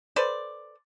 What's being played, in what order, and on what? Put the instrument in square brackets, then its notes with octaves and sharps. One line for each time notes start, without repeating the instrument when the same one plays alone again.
[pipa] A4 B4 C5 D5